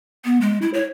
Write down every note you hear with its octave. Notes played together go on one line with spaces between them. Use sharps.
B3
G#3
E4
C#5